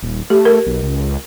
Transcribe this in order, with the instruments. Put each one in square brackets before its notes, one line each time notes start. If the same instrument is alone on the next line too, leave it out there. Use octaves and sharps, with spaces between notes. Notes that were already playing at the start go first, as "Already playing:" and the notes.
[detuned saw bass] D#1
[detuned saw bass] A3 [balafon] G4
[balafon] A#4
[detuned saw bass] B1
C#2